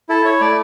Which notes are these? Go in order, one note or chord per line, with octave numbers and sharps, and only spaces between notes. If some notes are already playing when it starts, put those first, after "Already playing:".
E4 A4
E4 C#5
A3 D5